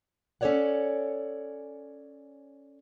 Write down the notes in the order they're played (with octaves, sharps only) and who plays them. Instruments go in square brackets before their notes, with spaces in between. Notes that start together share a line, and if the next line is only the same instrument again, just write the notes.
[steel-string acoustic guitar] C#4 A4 A#4 C#5 D5 F#5